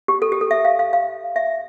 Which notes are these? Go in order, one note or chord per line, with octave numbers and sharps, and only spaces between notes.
G4
A4
G4
A4
E5
F5
F5
F5
E5